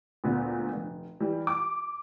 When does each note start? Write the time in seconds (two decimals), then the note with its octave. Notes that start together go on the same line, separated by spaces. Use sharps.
0.24 D2 A#2 D3 B3
0.72 F1
1.20 E3 G3
1.47 D6